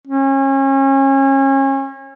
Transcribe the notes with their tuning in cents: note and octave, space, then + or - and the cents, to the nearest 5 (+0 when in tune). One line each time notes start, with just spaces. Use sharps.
C#4 -30